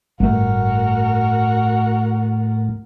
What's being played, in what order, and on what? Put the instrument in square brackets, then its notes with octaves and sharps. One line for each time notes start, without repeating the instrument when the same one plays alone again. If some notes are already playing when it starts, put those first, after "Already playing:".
[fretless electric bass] G1 A3 [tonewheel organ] A2 [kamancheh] F#4 A#4